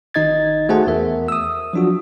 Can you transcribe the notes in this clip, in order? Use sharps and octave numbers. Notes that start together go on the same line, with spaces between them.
G#1 D#3 D#4 D#5 G#6 A6
A3 F#4 G#4 C5 F#5 A5
E2 A#4 E5
D#6 E6
F3 F#3 D4 F4 F#4